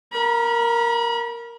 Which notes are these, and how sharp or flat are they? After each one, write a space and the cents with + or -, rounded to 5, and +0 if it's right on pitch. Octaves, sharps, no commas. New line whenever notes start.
A#4 +0 B5 -35